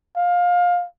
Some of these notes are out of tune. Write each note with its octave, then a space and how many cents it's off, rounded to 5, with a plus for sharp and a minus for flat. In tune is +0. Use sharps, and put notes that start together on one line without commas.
F5 +20